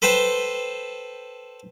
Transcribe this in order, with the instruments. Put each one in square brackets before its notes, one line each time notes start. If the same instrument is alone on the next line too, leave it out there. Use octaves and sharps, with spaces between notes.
[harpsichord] A4 B4 C5 G5 A5